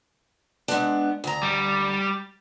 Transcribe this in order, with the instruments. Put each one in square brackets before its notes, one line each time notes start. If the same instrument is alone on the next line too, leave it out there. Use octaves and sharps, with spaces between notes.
[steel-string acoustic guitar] G#3 B3 D4
D2 A#5
[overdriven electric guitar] G3